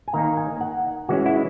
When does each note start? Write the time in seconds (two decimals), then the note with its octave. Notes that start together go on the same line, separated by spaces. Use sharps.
0.08 G#5
0.14 D#3 A#3 D#4 A#5
0.37 G#5
0.61 F#5
1.09 E3 G#3 C#4 F#4
1.26 E4